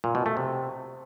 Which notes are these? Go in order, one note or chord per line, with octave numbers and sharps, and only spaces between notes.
A#2
B2
A3
C3